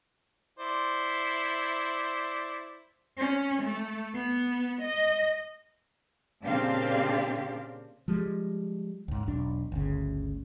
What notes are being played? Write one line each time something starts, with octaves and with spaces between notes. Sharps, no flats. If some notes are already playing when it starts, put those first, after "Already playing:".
E4 C5 D5
C#4
A3
B3
D#5
A#2 C#3 C4 D4 G4 F5
F3 G3 G#3
C#2 G#2
E1 B1 D4
G1 D2 C#3